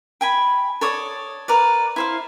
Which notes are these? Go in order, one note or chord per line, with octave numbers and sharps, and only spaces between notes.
G5 G#5 B5
A4 C#5 D5 D#6
A#4 B4 D5
E4 C5 F5